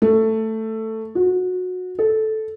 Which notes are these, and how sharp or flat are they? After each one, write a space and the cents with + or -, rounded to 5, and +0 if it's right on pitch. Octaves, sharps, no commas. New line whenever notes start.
A3 +10
F#4 -20
A4 -10